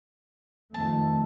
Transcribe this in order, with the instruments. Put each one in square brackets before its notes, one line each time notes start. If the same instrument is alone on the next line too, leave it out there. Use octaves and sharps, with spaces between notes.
[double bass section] F2 D#3 A3 [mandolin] A5